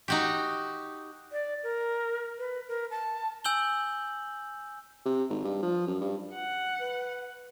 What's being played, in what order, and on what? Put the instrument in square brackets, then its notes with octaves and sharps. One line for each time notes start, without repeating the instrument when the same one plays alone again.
[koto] D#4 F#4 G4
[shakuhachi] D5
A#4
B4
A#4
A5
[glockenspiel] G#5 E6 G6 F#7 G7
[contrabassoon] C3
G#1
G2
F3
F#2
G2
[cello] F#5
[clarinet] B4